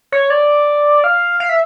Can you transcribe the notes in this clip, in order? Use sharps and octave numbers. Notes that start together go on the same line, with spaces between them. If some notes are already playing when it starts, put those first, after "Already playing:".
C#5
D5
F5
F5
E5